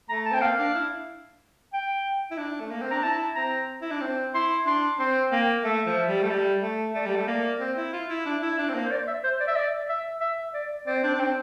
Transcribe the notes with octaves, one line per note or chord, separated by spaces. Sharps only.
A3 A#5
A5
C4 G5
A#3 F5
D4
E4
G5
E4
D4
A3
A#3
C4
D4 A#5
E4 A5
C4 A#5
E4
D4
C4
E4 C6
D4 C6
C4 C6
A#3 G5
A3 E5
F3
G3
A3
G3
A3
A3 D5
G3
A3
A#3
C4
E4
F4
E4
D4
E4
D4
C4
A#3
C5
D5
E5
C5
D5
E5
D5
E5
E5
D5
C4 D5
D4 C5
D4
C4 G5